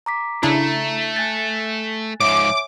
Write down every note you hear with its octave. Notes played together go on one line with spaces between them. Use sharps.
A#5 D6 B6
C#3 A3 D4 E4 A#5
G#5 F#6 A6
G#2 F3 C#5 E5 G#5 D6